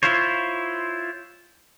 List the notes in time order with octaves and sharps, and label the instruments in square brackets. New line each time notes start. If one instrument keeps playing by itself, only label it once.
[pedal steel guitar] E4 F4 C5 C#5